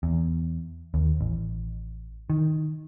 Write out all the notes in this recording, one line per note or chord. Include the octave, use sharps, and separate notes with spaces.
E2
D#2
A1
D#3